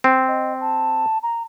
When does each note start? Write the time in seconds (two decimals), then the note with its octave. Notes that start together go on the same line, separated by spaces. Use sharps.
0.04 C4
0.28 D#5
0.61 A5
1.23 A#5